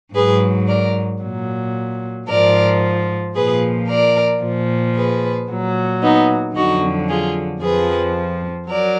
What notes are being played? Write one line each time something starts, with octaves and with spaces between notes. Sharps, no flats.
G#2 F#3 G#4 B4
A#4 D5
A#2 F#3
G#2 F3 A#4 D5
A#2 F3 G#4 B4
A#4 D5
A#2 F3
G#4 B4
A#2 F#3
B3 D#4
F2 D3 F#3 D#4 F#4
F4 G#4
F2 F3 G#4 B4
F#3 A#4 D5